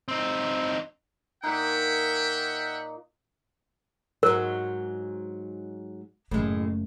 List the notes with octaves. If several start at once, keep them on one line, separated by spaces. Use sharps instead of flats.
C4 D#4
A#2 D#4 E5 F#5 G5
G#2 F#3 A#4
F#1 A2 G#3 A3